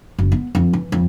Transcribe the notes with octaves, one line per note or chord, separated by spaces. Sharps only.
F#1
B3
F2
E3
F2